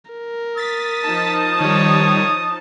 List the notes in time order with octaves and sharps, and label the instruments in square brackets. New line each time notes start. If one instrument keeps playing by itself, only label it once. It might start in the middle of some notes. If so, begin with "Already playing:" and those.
[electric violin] A#4
[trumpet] D#6 [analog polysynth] A6 B6
[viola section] F3 D#4 A5
[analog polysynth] D#3 G3 [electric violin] C#5